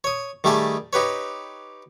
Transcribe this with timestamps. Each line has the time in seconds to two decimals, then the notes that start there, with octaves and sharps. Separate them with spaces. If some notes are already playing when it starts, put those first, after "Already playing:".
0.04 C#5 D#6
0.44 D#3 G3 A3 G4 G#4 A5
0.93 D#4 G4 B4 C#5